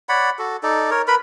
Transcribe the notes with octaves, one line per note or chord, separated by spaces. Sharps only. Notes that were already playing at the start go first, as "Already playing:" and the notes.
C#5 D5 F#5 B5
F#4 A4
D#4 A4 D5
A#4 C#5
A#4 B4 B5